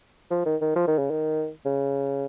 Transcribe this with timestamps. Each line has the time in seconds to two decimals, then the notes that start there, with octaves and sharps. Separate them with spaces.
0.30 F3
0.46 D#3
0.61 D#3
0.75 F3
0.87 D#3
0.98 C#3
1.10 D#3
1.65 C#3